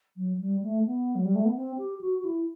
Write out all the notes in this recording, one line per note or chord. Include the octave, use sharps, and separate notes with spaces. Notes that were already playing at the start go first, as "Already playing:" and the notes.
F#3
G3
A3
B3
F#3
G3
A3
B3
C4
G4
F#4
F#4
E4